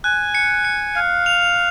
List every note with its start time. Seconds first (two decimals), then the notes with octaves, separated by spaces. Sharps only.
0.04 G#5 F#6
0.35 C#7
0.65 C#7
0.95 F5 C#7
1.26 F7